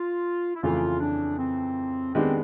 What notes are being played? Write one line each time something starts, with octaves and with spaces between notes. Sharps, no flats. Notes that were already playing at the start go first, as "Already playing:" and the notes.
Already playing: F4
E4
F2 C#3 E3 A3 F4
D4
C4
D#3 G#3 B3 C4 D4 G4